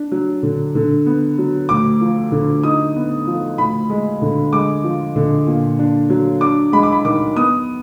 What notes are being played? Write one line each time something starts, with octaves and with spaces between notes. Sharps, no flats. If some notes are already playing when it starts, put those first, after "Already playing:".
Already playing: D4
F#3
D3
D3
B3
F#3
D2 D6
F3
D3
D#4 D#6
B3
F3
D2 B5
G#3
D3
G#3 D6
F3
D3
A#2
D4
F#3
D4 D6
G#3 B5
D6
B5
D#3 D6
B3 D#6